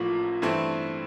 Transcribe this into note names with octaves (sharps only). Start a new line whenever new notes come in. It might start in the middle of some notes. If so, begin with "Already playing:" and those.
Already playing: A1 A2 F3 A#3
G2 E3 A3 C4